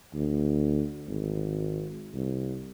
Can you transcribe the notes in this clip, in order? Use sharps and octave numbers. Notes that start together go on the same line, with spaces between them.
D2
G#1
C2